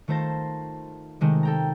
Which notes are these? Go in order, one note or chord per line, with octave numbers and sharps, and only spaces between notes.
D#3 A3 F4 C5 A5 A#6
C3 D#3 G#3 A3
A4 G5 A#5